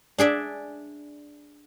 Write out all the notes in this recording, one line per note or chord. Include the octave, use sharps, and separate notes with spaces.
D4 G#4 D5 E5